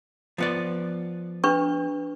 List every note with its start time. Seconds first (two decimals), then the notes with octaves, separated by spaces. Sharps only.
0.38 F3 B3 D5
1.44 D4 B4 C#6